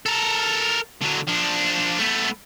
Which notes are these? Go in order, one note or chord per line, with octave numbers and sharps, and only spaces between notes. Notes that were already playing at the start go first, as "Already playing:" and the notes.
A4 A#4
D3 F#3
F3 D4
A3 B3